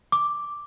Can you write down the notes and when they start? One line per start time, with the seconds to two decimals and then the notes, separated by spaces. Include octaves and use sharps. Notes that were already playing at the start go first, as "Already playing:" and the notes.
0.12 D6